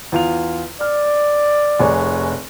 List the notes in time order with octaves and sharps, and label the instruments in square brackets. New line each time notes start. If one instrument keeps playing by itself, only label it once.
[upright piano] E2 F4 F7
[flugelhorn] D5 [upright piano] F6
[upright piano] F1 G#4 C#5